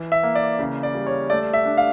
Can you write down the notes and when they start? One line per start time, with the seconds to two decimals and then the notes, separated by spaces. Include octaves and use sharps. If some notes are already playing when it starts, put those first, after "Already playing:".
Already playing: E3
0.12 E5
0.23 A#3
0.35 D5
0.59 C#3
0.83 D5
0.95 G3
1.06 C#5
1.30 A3 D5
1.54 E5
1.65 D4
1.77 F5